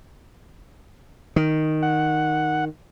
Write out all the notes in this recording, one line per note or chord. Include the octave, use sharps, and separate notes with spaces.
D#3
F#5